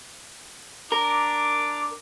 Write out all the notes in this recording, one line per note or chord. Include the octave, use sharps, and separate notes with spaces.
D4 A#4 D6